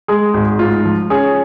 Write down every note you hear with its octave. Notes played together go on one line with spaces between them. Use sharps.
G#3 G#4
G#1
G#2 F4
F3
C#4 G#4